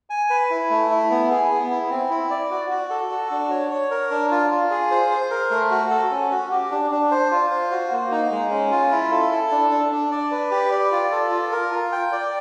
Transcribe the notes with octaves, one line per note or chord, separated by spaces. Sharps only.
G#5
B4
E4
A3
E4
B3
G#4
B3
E4
C4
E4
D5
F#4
F#4
A4
F#4
D4
C#5
C#5
A#4
D4
F4
F4
G#4
C5
C5
A#4
A3
F#4
A4
C#4
F#4
G4
D4
D4
C5
F4
C5
F#4
A#3
D#4
G#3
C#4
F4
E4
A4
A4
D4
D4
D4
D5
B4
G4
D5
F4
A4
F4
A#4
F4
G5
D5